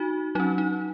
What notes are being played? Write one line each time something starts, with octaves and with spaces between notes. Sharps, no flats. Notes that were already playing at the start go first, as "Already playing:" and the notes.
Already playing: D#4 F#4
F#3 C#4 D#4
D#4